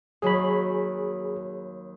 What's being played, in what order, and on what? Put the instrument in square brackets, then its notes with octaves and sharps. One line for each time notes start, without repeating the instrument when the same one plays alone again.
[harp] D#2 F#3 [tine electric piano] G#4 B5